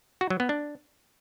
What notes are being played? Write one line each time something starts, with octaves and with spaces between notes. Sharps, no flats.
F#4
F#3
B3
D4